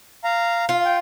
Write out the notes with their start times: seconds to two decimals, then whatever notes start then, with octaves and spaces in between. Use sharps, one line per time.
0.24 F5 A#5
0.69 F4
0.85 G5